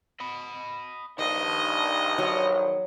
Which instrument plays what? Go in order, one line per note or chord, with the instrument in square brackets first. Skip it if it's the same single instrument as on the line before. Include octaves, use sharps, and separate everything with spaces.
[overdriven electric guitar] D#5 B5
[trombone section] A#1 G2 [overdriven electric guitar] D#3 [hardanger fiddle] D#5
[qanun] F#3